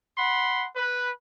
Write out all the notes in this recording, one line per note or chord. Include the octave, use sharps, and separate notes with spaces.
F#5 B5 C6
B4